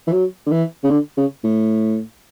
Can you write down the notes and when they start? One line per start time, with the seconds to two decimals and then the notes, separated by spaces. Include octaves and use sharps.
0.07 E3
0.13 F#3
0.47 D3
0.51 E3
0.84 C#3
0.90 D3
1.17 C#3
1.44 A2